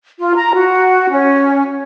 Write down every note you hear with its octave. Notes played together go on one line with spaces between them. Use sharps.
F4
A#5
F#4
C#4